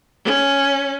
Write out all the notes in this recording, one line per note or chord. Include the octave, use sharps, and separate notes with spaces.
C#4